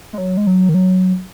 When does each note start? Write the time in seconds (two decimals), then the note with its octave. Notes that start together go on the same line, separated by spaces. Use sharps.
0.13 G#3
0.18 F#3
0.37 G#3
0.47 F#3
0.69 D#3
0.74 F#3